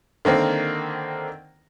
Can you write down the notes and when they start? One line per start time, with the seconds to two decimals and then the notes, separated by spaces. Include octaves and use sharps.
0.25 D3 D#3 A#3 C4